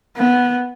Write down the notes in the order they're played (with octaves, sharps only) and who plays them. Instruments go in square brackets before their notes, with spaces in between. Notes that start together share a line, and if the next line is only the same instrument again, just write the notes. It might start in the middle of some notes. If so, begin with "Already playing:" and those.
[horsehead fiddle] B3